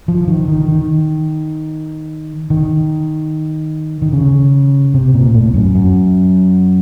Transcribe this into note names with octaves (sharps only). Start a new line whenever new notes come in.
F3
D#3
D#3
D#3
D#3
D#3
C#3
C3
A#2
A2
F#2
F#2